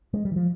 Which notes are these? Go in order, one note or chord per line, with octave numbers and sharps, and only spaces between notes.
G#3
G3
E3
F3